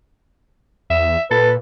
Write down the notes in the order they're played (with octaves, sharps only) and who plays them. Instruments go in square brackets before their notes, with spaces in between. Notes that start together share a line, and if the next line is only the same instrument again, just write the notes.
[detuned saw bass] E2 [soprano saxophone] E5
[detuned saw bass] A#2 [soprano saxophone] A4 [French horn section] B4